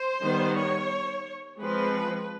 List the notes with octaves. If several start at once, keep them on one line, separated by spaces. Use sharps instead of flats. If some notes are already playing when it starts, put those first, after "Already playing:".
Already playing: C5
D#3 G3 B3
C#5
F3 G#3 C4 B4